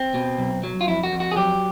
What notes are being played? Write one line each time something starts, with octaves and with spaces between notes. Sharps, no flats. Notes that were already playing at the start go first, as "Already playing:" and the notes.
Already playing: C4
B2
B1
F#3
F4
F2 E4
F#4
F2
F#4
G#4
F#3 G4